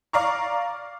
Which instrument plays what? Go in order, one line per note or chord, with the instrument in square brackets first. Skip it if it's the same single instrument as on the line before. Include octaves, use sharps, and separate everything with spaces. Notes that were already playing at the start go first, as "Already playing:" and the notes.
[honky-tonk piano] D5 F5 A#5 C#6